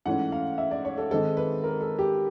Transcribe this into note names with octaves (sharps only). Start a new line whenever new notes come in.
G#2 E3 A3 C#4 F#5
F5
E5
D5
C#5
A4
G#2 D#3 G#3 C4 A4
B4
A#4
A4
G4